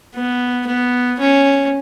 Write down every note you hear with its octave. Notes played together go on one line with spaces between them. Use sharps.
B3
B3
C#4